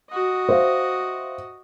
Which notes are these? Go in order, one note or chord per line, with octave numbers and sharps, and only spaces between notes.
F#4 D#5
C5 E5 F5